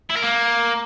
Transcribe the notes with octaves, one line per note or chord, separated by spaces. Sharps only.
E4
A#4
A#3